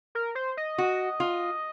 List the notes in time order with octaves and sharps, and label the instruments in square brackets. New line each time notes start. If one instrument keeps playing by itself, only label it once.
[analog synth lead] A#4
C5
D#5
[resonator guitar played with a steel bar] F#4
F4